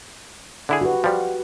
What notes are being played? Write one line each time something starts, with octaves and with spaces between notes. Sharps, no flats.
D3 E4 G#4
F#4 G4 B4
F3 G3